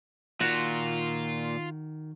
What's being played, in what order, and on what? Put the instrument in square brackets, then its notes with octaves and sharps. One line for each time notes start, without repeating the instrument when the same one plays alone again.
[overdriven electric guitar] A#2 [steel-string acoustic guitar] D#3 [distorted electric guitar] F4 [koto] F#4